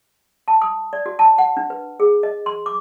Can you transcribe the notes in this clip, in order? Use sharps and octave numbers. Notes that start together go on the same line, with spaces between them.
A5
D#6
D5
F#4
A5
F#5
D4
B4
G#4
D#5
C6
D6